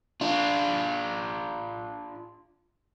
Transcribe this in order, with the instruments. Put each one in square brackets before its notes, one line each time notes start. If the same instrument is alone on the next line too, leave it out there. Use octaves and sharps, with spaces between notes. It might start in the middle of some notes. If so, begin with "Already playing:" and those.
[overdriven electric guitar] D4 F4